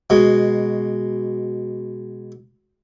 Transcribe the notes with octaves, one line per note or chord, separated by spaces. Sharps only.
B2 G#3